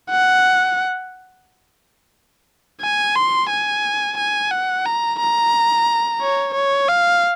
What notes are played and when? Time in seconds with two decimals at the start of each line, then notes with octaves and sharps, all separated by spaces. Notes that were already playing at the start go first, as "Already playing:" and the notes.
0.10 F#5
2.81 G#5
3.16 C6
3.50 G#5
4.18 G#5
4.51 F#5
4.85 A#5
5.20 A#5
6.21 C#5
6.55 C#5
6.89 F5